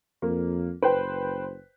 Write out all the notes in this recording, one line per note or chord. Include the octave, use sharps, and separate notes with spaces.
F2 A#3
F#1 B4 C5 G5